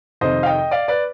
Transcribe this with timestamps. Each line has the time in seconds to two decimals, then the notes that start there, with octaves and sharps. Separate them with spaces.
0.21 F2 C3 D#3 C5 D#5
0.43 F5
0.46 D#5 G5
0.71 D5 F5
0.88 B4 D5